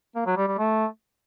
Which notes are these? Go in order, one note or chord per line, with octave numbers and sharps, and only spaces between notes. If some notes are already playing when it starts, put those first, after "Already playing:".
A#3
F#3
G3
G3
A3